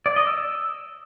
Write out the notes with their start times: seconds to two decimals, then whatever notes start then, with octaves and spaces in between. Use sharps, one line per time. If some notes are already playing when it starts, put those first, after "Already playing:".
0.06 D5
0.16 D#5
0.27 E6